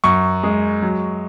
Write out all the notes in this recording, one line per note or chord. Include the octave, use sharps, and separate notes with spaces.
F#2 C#6
G#3
F#3